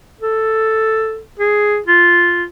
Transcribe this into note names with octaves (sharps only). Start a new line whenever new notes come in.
A4
G#4
F4